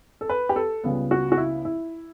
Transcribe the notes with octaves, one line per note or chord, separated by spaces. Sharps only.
A4
B4
G4
A4
C#2 C#3 G3 B3
F#4
F#4
E4
E4